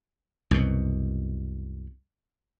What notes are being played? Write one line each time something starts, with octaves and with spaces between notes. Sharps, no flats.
C2 F#2 B2